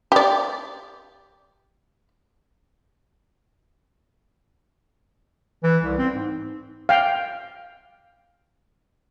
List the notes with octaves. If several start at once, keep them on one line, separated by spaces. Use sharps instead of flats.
G4 D5
E3
C2
C4
G#2
F5 G5